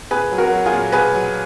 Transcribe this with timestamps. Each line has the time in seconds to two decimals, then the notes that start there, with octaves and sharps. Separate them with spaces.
0.11 A#2 G#4 B4
0.31 F#3
0.38 F#4 A#4
0.52 F#3
0.66 F4 G#4
0.72 A#2
0.92 B2 G#4 B4
1.14 F#3